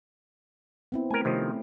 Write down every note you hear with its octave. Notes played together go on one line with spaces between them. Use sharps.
B3 C4 E4
A3 A#4 G#5
C3 D#3 F3 A3 C#4